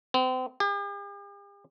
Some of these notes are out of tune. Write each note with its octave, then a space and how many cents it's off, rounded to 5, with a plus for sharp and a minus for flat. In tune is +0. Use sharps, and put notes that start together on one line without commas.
C4 -35
G4 +45